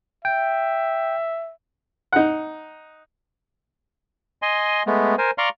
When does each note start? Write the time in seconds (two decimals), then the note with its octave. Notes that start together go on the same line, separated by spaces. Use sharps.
0.25 E5 G5
2.12 D#4 F#5
4.42 D#5 G#5 C6
4.87 G#3 A3 B3
5.18 A#4 C5 G#5
5.38 D5 F5 A#5 C6 C#6 F6